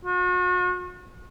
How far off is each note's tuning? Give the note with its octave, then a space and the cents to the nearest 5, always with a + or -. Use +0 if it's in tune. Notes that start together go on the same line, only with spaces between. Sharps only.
F#4 -40